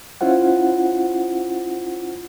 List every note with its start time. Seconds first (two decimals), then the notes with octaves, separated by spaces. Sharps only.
0.21 C#4 E4 F4 C5 F#5